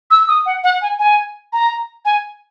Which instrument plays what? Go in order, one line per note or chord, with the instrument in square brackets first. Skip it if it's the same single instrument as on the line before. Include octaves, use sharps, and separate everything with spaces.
[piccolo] E6
D#6
F#5
F#5
G#5
G#5
A#5
G#5